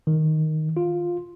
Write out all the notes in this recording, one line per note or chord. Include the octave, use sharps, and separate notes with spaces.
D#3
F4